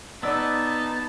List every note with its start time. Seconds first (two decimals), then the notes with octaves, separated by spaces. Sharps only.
0.23 B3 D#4 D5 A5 E6